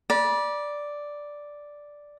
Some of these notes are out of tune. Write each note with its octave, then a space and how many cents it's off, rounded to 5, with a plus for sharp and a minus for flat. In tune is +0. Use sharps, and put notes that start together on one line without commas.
D5 +0 B5 -40